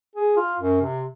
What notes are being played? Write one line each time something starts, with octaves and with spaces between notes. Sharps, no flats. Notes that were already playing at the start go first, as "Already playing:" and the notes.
G#4
F4
F#2
C3